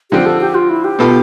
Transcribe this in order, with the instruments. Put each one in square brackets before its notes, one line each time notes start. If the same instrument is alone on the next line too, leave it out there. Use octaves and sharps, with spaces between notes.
[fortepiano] D3 F3 C4 [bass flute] G4
[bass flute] A4
G4
F4
E4
G4
[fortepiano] B2 B3 F4 A4